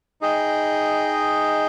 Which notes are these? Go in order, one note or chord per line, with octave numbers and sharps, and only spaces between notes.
D#4 G#4 D#5 G5